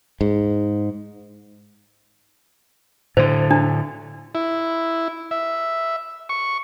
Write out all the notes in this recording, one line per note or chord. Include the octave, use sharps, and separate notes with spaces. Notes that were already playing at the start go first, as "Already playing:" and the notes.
G#2
A2 D3 C5
D4
E4
E5
C#6